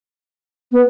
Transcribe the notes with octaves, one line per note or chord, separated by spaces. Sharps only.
B3